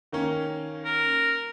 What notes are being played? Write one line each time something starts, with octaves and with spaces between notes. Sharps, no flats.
D#3 A#3 C#4
A#4